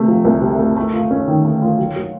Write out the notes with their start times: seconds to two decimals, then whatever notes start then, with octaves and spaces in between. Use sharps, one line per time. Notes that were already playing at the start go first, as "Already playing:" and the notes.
Already playing: C3 A3
0.08 F3
0.25 C2
0.42 C3
0.59 A3
0.77 A3
0.93 F4
1.11 C#4
1.28 D#3
1.45 A3
1.62 F4
1.79 F#3
1.96 F#4